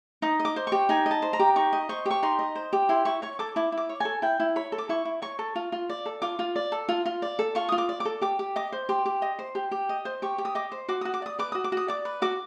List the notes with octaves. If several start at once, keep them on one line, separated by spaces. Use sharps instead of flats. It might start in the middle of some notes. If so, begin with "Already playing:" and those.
D#4 D#6
D#5
D6
C5
G4 C#6
D#4 G#5
D#5
A5
C5
A#5
G4
D#4 C#6
D#5
C5 C#6
G4 C#6
D#4 C6
D#5
C5
G4
E4 C6
E4 C#6
C#5 C#6
A4 D6
E4 D6
E4
D6
C#5
A4 G#5
E4 G5
E4
C#5 B5
A4
D6
E4 C#6
E4
C#5 C#6
A4
F4
F4
D5
A4
F4 D6
F4
D5
A4
F4
F4
D5
A4
F4 C#6
F4 D#6
D6
D5
D6
A4
G4 D6
G4
D#5 D6
C5
G4 C6
G4
D#5
C5
G4
G4
D#5
C5
G4 C#6
G4
D#6
D#5 D6
C5
F#4 D6
F#4 D#6
D6
D5 D#6
B4 D6
F#4 D#6
D6
F#4 D#6
D5 D6
B4
F#4 D6